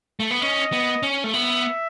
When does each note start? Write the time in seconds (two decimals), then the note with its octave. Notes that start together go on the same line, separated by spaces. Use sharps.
0.20 A3
0.31 B3
0.42 C#4 D#5
0.72 B3
1.03 C#4
1.24 A3
1.33 B3 E5